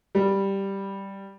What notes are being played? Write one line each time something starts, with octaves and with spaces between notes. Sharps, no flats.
G3